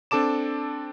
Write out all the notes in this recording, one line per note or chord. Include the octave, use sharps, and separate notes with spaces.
C4 D4 A4 A5 D6 E7